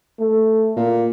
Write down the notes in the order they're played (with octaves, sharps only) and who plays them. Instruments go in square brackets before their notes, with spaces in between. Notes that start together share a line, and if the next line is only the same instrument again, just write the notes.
[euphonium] A3
[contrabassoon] A#2